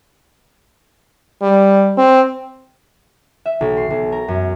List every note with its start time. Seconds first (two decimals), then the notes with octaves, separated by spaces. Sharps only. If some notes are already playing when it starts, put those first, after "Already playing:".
1.42 G3
1.97 C4
3.45 E5
3.61 B1
3.77 C6
3.90 B1
4.12 A#4
4.28 F#2